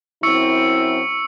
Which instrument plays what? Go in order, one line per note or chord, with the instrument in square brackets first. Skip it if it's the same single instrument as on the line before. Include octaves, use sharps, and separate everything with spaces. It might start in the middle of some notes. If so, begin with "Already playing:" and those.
[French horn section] F#2 C4 E4 [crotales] C#6 E6 C#7